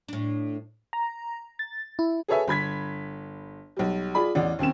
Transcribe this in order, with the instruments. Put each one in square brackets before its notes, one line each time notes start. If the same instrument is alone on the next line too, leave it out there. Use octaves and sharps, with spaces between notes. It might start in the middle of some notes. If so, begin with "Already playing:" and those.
[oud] A2 D4
[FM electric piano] A#5
A6
E4
[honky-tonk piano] G#4 A4 B4 C#5 E5 G#5
G1 B5 G#6 B6
B1 G3
F4 G#4 D5 B5
A1 E2 D5
D#2 C4 C#4 E7